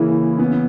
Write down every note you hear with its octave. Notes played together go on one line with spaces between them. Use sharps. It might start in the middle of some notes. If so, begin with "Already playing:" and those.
Already playing: C#3 E3 A#3 E4
B3 C#4